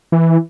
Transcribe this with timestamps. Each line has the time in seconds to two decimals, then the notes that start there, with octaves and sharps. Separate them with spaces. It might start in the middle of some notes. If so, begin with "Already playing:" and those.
0.12 E3